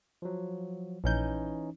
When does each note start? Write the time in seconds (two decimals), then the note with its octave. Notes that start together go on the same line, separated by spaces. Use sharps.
0.22 F3 F#3
1.04 A#1 E3 C#4 D#4 G6